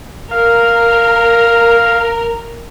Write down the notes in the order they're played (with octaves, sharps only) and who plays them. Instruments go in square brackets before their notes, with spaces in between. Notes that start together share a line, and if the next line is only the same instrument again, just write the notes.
[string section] A#4 [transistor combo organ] F5